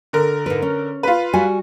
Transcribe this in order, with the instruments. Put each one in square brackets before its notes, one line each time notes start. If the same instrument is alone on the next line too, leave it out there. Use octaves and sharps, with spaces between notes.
[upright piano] D3 A#4
[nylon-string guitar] G#2 B4
C#4
[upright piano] F4 B4
[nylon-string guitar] G3 F#4 G#5